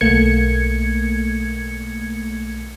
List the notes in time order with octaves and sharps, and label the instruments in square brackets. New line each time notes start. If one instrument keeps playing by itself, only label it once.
[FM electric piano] B1 A3 A#3 G#6 C#7